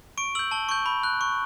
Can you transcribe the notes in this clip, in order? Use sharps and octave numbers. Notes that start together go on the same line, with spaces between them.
C#6 D7
E6 G6 F#7
A5 G7
C#6 G6
B5
F#6
C#6